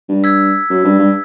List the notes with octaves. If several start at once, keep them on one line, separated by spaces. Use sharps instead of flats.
G2
E6 G#6 B6
F#2
G2
G2